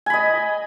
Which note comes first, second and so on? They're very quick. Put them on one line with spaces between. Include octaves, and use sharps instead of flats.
G#5 B5 D#5